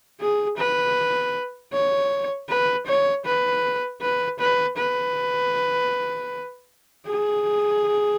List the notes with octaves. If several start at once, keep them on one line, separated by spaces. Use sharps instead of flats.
G#4
B4
C#5
B4
C#5
B4
B4
B4
B4
G#4